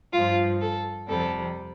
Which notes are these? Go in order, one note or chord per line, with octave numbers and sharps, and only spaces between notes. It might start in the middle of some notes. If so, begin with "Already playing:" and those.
G2 F3 F4
A4
F2 C3 G3 A4